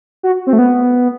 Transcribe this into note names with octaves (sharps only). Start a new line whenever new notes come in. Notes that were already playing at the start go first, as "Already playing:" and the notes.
F#4
C4
A3
B3